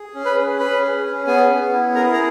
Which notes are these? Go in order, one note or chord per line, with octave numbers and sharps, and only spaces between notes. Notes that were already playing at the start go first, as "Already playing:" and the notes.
Already playing: G#4
C#4
B4 B5
G#4
C#4 B4 B5
G#4
C#4
B3 G#4 G#5
B3
E4
G#4 A#4 A#5
A#5